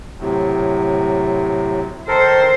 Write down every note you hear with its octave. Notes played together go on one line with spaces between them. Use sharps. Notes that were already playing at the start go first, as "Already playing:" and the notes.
A2 C3 F#3
D#3 A4 A#4 C5